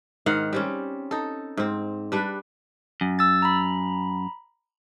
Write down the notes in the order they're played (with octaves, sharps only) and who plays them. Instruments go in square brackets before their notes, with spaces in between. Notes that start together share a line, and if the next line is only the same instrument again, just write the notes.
[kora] G#2 D#3 F5 F#5
G3 C4 C#4
D#4 A4
G#2 C4
G3 D4 B4
[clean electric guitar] F#2
[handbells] E6 A6
A#5 B5